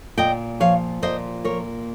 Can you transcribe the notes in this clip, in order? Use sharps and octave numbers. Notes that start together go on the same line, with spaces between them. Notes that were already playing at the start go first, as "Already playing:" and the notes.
A#2 D#5 G5
F3 C#5 F5
A#2 C5 D#5
A#3 A#4 C#5